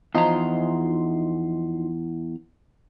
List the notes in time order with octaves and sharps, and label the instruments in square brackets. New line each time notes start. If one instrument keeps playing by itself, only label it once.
[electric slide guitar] E2 A#5 [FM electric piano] F3 D#4 C6